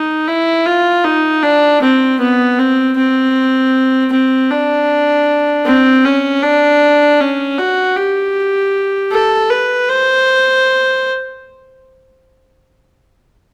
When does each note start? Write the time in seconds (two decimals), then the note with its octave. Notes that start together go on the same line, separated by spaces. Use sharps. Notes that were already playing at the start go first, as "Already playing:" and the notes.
Already playing: D#4
0.27 E4
0.66 F4
1.04 D#4
1.43 D4
1.81 C4
2.19 B3
2.59 C4
2.97 C4
4.12 C4
4.51 D4
5.65 C4
6.04 C#4
6.43 D4
7.20 C#4
7.58 F#4
7.96 G4
9.12 A4
9.50 B4
9.89 C5